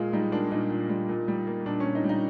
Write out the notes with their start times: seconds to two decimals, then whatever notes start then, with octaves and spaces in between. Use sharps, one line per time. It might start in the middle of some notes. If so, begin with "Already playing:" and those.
Already playing: A#2 G#3 F4
0.13 G3 D#4
0.32 A#3 D4
0.52 A#2 D#4
0.71 A#2
0.89 G3
1.09 A#2
1.28 G3
1.47 A#3
1.66 A#2 D4
1.80 A#2 C#4
1.95 D#4
2.04 G3
2.09 D#4